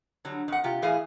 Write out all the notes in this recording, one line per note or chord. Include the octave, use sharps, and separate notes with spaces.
D3 F#3 G3
F2 F#5
C3 F4 G4
A2 E3 E4 G#4 F5 G#5